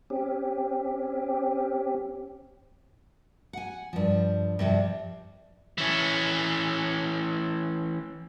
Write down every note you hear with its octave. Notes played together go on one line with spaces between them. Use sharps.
C4 C#4 G4
F#5 G#5
G2 F3
G2 C3 F3
E3 C#4